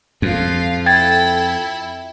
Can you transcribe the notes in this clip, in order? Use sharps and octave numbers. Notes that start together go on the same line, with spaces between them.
F2 F4 F5
E4 A4 G5 G#6 A6